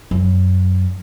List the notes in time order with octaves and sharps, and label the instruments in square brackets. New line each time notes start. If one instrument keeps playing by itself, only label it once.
[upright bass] F#2